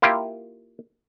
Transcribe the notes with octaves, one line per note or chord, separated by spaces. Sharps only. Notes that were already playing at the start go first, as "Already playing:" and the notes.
A#3 E4 F4 G4